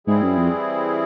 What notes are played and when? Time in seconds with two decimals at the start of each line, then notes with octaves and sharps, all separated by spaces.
0.07 G#2 E3 G3 C4 E4 G#4
0.22 F#2
0.38 F2